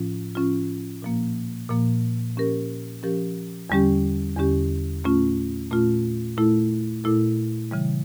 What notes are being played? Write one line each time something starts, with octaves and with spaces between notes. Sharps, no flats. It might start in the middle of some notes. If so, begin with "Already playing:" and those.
Already playing: A2 F3 C#4 F4
A2 F3 C#4 F4
A#2 F3 A#3
A#2 F3 A#3
F3 C#4 G4 A#4
F3 C#4 G4 A#4
E2 D3 G3 C#4 G4
E2 D3 G3 C#4 G4
A#2 A3 C#4 F4
A#2 A3 C#4 F4
A#2 A3 E4 A4
A#2 A3 E4 A4
C#3 E3 G3